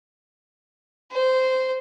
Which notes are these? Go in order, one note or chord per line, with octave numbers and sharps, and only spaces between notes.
C5